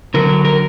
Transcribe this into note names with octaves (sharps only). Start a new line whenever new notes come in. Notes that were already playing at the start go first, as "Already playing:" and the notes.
D3 F#3 A#4
A#4